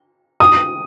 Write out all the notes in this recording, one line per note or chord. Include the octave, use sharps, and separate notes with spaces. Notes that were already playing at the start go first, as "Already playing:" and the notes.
D#6